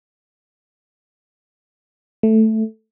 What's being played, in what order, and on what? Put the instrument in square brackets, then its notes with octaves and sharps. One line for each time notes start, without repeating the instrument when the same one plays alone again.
[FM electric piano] A3